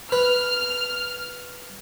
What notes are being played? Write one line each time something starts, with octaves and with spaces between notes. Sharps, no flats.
B4 F6